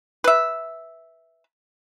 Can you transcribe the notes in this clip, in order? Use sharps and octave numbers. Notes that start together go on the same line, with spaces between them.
B4 E5